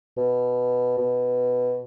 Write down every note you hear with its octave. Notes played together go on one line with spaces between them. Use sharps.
B2
B2